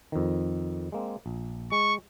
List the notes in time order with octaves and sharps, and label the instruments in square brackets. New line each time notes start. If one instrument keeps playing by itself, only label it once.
[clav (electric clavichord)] F2 D#3
G#3 A#3 C4
A#1
[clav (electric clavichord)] G#3 [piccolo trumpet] C#6